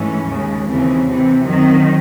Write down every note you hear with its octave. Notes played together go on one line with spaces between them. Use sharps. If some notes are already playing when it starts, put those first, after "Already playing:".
Already playing: G#2 E3 A3 C#4
D#2 C#3 G#3
D#2 C#3 E3 C4
C3 E3 C4
F#2 D#3 F#3 C4 D#4